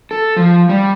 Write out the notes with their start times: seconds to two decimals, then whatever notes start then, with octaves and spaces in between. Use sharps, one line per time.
0.11 A4
0.36 F3
0.69 G3